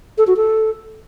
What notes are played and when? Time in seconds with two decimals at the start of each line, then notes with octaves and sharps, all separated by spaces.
0.18 A4
0.27 F#4
0.36 A4